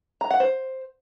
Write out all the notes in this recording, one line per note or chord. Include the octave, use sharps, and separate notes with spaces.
A#5
F#5
C5